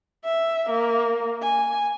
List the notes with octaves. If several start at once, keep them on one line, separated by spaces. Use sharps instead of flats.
E5
A#3
G#5